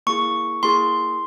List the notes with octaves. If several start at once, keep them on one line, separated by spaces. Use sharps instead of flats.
A#3 E4 G#4 C#6
A#3 E4 G#4 C6